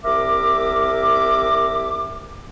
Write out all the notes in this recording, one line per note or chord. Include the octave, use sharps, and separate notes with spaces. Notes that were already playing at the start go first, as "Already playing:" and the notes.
C2 A#4 E5 D6